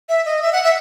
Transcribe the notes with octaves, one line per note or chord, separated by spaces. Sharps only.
E5
D#5
E5
F#5
E5